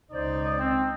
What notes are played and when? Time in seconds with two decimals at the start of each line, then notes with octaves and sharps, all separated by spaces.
0.13 C#2 D#4 C5 D5
0.58 C4